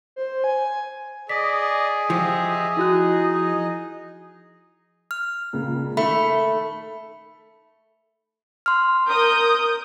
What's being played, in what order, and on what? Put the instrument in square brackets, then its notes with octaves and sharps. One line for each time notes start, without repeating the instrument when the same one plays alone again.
[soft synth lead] C5
G#5
[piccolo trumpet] G#4 [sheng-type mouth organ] D5 D#5 [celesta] B6
[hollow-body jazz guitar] F3 [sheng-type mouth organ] G4 D#5 E5
[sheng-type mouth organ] D#4 D#5 [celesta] E4 F#4 F#6
[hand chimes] F6
[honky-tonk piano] C#2 A#2 C#3
[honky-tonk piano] D#3 [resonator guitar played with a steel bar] A3 [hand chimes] B5
[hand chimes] C6 F6
[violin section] A#4 D#6 G6